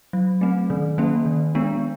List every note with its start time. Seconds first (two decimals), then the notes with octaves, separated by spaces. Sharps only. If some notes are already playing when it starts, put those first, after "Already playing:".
0.13 F#3
0.41 A3 C4
0.70 D#3
0.98 F#3 A#3 C#4
1.26 D#3
1.55 G#3 B3 D4